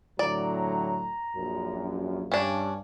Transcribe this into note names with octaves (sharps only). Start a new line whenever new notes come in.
A2 D3 F#3 D5 A#5
A#1 F#2
G2 C#4 D4